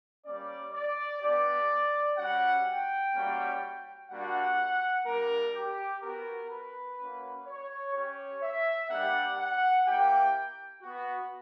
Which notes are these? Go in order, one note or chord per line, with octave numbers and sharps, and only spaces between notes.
G3 A#3 C#4 D5
D5
B3 D4 G4 D5
G3 C#4 F#4 F#5
G5
G3 A#3 C#4 F#4
G3 A#3 D4 F#4 F#5
G3 A#3 D4 A#4
G4
B3 F#4 A#4
B4
A#3 C#4 F#4
C#5
C#4 G4 C#5
E5
G3 A#3 D4 G4 F#5
F#5
A#3 E4 G4 G5
B3 F#4